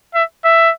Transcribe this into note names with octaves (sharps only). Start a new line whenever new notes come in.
E5
E5